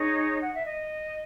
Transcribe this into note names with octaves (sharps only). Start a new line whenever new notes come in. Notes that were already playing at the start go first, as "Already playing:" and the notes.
Already playing: D#4 G#4 C#5
F#5
E5
D#5